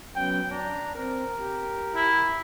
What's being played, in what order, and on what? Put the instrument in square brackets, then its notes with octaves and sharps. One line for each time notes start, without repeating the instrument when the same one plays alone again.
[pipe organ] F#3 B3 C#4 [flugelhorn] G5
[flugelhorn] D4 [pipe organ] A#5
[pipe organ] C4 [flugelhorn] A#4
[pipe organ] G4
[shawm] E4